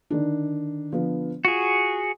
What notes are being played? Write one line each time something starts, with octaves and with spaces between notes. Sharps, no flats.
D3 D#3 D4
D3 F3 B3
F4 F#4 G#4